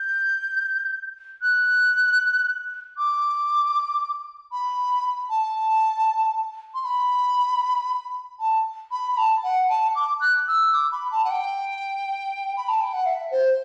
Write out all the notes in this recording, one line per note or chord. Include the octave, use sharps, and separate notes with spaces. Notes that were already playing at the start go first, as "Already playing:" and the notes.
Already playing: G6
F#6
D6
B5
A5
C6
B5
A5
B5
B5
A5
F#5
A5
D6
F#6
E6
D6
B5
A5
F#5
G5
B5
A5
G5
F#5
E5
C5